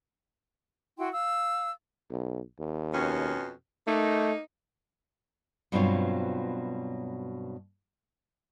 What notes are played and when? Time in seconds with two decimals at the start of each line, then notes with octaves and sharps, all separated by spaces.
0.98 E4 F#4 G5 C6
1.12 F5 E6
2.10 B1
2.59 D#2
2.94 F2 B2 C#4
3.87 A3 A#3 D#4
5.72 G2 B2 F#3 C4 F4 C#5